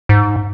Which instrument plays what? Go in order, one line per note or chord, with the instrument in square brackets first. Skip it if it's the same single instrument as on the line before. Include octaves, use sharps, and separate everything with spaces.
[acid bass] G#2